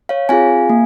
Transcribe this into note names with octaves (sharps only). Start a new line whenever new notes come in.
C#5 F5
C4 F4 G#4 F5 G#5
A#3